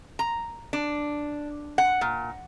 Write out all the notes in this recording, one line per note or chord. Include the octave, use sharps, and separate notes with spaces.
A#5
D4
F#5
A#2